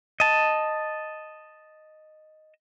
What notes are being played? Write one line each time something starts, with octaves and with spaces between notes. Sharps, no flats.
D#5 A5